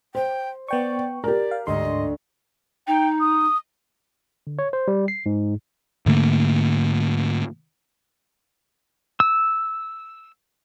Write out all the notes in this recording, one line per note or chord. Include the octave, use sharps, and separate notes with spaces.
C5 G5
B3 D5 G5 C#6
G4 A#4 D5
F5
D2 G#2 D#5 C6
D#4 G5
D#6
D3
C#5
C5
G3
C7
G#2
G#2 D3 A3 A#3
E6